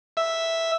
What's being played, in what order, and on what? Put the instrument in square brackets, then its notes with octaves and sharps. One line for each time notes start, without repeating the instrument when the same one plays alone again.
[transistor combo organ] E5